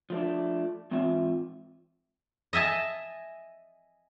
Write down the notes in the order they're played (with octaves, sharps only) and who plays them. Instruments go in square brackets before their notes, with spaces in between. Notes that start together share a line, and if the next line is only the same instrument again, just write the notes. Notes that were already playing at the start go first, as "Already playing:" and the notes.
[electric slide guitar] F3 A3 D4
G#2 E3 C4 F4 E5
[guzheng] D#5 E5 G#5 A5